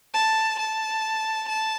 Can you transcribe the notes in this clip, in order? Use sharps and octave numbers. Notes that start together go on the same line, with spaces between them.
A5
A5
A5